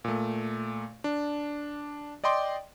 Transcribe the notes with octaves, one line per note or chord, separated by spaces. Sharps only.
A#2 A3
D4
D5 D#5 G5 C6 D6